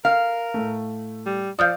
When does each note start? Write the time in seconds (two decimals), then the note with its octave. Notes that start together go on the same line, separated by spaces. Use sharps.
0.05 A#4 F5
0.54 A2 A3
1.26 G3
1.59 F3 D5 F5 D#6 F6 G6